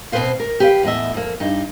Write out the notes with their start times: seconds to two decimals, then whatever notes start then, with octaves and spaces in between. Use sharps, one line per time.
0.12 B2 C4 G#4 B4 C5 F5
0.40 A#4
0.60 G4 G#4 B4 C5 F5 G5
0.83 E2 A2 D#5 E5
1.14 F2 A#3
1.40 G2 D#4